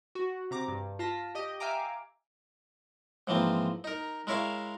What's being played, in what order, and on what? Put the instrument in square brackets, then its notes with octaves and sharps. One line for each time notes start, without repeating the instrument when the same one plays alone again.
[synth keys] F#4
C3 A#5 D6
G2
F4 A5 A#6 B6
G4 D#5 D#6
E5 F5 G5 G#5 A#5 D6
[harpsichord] G#2 E3 F3 A#3 C4
D#4 A#4
G#3 E4 A#4 C#5 E5 F5